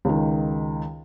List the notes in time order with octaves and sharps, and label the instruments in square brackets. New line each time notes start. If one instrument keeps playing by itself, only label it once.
[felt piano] C#2 D#3